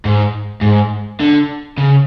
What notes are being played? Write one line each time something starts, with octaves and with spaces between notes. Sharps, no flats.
G#2
G#2
D3
C#3